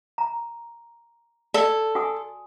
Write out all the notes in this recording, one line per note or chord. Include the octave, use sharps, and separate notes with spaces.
A#5
A4 D5
F#4 G#5 D#6